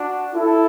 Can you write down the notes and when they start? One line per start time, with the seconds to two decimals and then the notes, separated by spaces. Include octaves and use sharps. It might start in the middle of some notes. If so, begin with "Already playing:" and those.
Already playing: D4 F#4
0.34 E4 A4